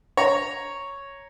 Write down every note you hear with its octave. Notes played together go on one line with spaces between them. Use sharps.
C#5 A#5